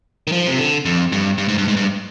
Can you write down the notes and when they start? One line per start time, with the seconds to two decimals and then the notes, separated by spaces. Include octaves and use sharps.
0.27 D#3
0.32 F3
0.47 C3
0.58 D3
0.85 F2
1.12 G2
1.38 G2
1.48 G#2
1.58 G2
1.68 G#2
1.77 G2